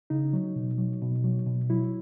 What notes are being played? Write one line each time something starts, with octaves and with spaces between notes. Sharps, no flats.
C#3 D#4
F#3
B2
F#3
B2
F#3
B2
F#3 E4